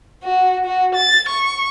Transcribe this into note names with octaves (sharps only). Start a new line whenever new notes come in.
F#4
F#4
A6
C#6